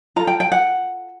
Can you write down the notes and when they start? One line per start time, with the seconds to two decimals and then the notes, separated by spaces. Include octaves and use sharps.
0.16 F4 A4 A#5
0.27 G5
0.40 G5
0.52 F#5